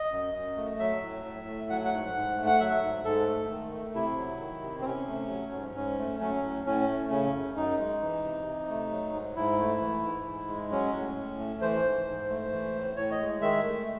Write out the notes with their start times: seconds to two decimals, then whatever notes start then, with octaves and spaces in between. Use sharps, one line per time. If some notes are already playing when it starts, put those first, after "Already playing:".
Already playing: D#5
0.12 F#2
0.34 F#2
0.56 A3
0.79 F#3 E5
1.02 A2
1.24 A2
1.47 A3
1.70 F#3 F#5
1.85 F#5
1.92 G#2
2.14 G#2
2.37 A3
2.46 F#5
2.60 F#3 E5
2.82 G#2
3.05 G#2 A4
3.27 A3
3.50 D#3
3.72 A3
3.94 C3 E4
4.17 F#3
4.40 D#3
4.62 C3
4.81 C4
4.85 C3 C#4
5.08 A3
5.29 F#3
5.53 G#2
5.75 G#2 C#4
5.98 A3
6.20 F#3 C#4
6.43 A2
6.66 A2 C#4
6.88 A3
7.10 C#3 C#4
7.33 F#2
7.56 F#2 D#4
7.78 G#3
8.01 E3
8.23 C3
8.45 C3
8.69 A3
8.91 F#3
9.13 G#2
9.35 G#2 E4
9.58 A3
9.80 E3
10.04 G#2
10.26 G#2
10.48 G#3
10.71 F#3 C#4
10.94 A2
11.16 A2
11.38 A3
11.61 E3 C5
11.84 G#2
12.07 G#2
12.29 A3
12.51 E3
12.74 A2
12.96 A2 C#5
13.11 D#5
13.19 G#3
13.41 D#3 E5
13.64 A3